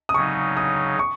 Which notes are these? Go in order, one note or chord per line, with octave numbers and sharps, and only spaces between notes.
D#6
C#3 F#3 D#4 C#6
D#6
C#6